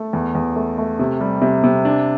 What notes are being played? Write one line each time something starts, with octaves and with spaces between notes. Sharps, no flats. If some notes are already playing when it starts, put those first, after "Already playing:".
Already playing: A3
E2
E2
A3
A3
C3
G3
C3
C3
D4